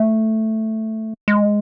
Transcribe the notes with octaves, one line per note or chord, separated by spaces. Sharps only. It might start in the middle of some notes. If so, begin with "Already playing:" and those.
Already playing: A3
G#3